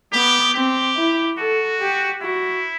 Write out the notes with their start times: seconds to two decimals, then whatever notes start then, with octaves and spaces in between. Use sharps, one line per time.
0.13 B3 G4
0.54 C4 G4
0.96 E4
1.38 F#4 A4
1.80 G4
2.22 E4 F#4